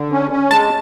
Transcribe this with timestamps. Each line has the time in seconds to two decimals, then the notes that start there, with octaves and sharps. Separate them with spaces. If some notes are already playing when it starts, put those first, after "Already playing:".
Already playing: D3
0.12 C#4
0.31 C#4
0.51 G#3 A5